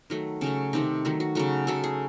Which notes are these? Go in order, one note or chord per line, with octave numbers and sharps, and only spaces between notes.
D#3 F#3 A3
C#3 F#3 A3 C#4
C3 D#3 A3 D#4
D#3 F#3 A3
F#4
C#3 F#3 A3 F#4
C#3 F#3 A3 A4
G#4